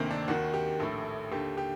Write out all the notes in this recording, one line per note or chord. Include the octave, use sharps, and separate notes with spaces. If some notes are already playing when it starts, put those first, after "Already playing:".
Already playing: D2 C3 D#3 A#3 C4
D4
D#2 D#3 F#4
G4
A#1 A2 A4
D#2 D3 G4
G4